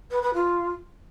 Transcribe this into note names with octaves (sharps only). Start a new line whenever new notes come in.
B4
B4
F4